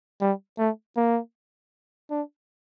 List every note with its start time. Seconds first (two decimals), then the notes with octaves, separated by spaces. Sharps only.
0.21 G3
0.58 A3
0.97 A#3
2.10 D4